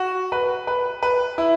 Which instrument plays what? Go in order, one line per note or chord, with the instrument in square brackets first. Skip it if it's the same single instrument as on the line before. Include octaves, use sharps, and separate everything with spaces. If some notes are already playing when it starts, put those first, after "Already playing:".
Already playing: [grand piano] F#4
B4
B4
B4
E4